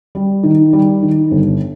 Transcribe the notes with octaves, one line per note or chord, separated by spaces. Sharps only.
G3
D#3
G3
D#3
G1